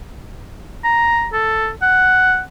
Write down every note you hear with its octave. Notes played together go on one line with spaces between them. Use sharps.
A#5
A4
F#5